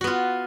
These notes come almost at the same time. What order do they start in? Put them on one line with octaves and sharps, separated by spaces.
F#4 B3 F4